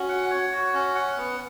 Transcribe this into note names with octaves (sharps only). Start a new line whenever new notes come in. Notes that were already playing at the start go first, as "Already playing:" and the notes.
Already playing: C#4 F#4
F#5
C#5
F#4
C#4
F#5
B3